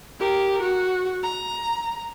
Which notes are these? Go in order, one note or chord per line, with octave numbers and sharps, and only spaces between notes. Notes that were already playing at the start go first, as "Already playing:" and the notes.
G4 A#4
F#4
A#5